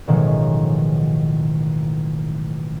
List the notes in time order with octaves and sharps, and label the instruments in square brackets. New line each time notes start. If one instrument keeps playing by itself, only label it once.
[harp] A1 B2 D#3 F3 F#3 G#3